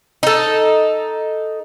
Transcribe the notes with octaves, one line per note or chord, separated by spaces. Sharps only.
D#4 A4